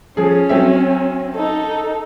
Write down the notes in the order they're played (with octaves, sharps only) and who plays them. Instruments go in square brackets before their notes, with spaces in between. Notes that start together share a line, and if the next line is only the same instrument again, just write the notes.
[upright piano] F3 G#4 [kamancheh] C#4
[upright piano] F#3 C4 E5
[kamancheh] D#4 A4